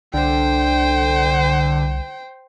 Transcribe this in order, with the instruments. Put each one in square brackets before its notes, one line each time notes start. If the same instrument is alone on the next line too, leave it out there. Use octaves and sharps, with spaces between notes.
[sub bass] C2 [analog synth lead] D3 [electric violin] C5 G5